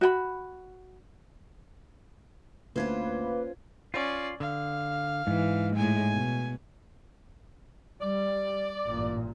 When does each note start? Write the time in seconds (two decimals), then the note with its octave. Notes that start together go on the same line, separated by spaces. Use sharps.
0.01 F#4 G5 B5
2.76 D2 A#3 C#4 F4 B4 C5 G#6
3.94 C#4 F4 D5
4.40 D3 F5
5.27 G#2 E3
5.76 A2 G#3 G#5
6.11 B2
8.01 G3 D5
8.84 A1 G2 A#2